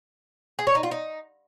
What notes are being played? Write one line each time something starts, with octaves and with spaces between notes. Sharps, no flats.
G#4
C#5
D#4
F4
D#4